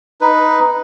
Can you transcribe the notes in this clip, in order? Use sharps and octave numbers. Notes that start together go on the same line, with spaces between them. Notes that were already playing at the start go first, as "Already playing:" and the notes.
D#4 B4